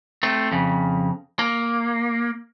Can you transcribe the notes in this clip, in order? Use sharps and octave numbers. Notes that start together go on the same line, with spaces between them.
A3 C4
F2 C#3
A#3